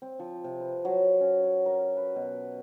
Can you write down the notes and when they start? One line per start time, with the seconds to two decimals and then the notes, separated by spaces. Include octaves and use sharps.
0.02 C4
0.20 F3
0.44 C3
0.60 B4
0.85 F#3
1.21 C#4
1.44 C#5
1.66 A#4
1.97 B4
2.16 B2